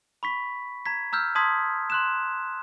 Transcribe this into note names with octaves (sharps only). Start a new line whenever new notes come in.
B5 C#6 B6
A#5 G#6 B6
A#5 E6 F6 G6
A5 C6 D#6 G#6 B6
C6 F#6 E7